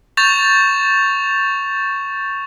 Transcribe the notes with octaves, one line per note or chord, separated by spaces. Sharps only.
C#6 G6 A6 E7 F7